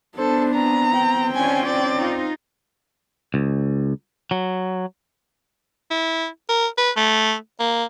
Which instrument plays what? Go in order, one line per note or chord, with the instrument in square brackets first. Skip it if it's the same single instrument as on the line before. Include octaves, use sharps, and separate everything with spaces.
[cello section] B3 [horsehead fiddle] D4 [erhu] A4 [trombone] C5
[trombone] C4 [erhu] A#5
[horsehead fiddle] G5
[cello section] C#4 D4 F4 [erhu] G#5
[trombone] C4 [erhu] D5
[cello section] D#4 F4
[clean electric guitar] C#2
F#3
[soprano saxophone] E4
A#4
B4
A3
A#3